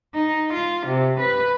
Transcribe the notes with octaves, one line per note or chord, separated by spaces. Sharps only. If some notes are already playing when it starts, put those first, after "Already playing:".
D#4
F4
C3
B4